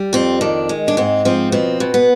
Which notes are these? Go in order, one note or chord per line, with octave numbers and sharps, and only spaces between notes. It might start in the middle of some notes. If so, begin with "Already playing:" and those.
Already playing: G3
F2 C4
D#3 D4
G#3
D4
G#2 C4
F3 C4
B2 C4
B2
B3